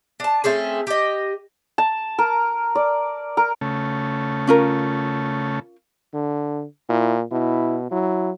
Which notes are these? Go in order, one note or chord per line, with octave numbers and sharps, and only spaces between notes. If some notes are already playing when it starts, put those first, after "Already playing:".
D4 A5
A3 C4 C#4 G#4
G4 D#5
A5
A#4
D5
A#4
C#3 A3
C#4 F4 A#4
D3
A#2 E4
B2 E4
F#3 E4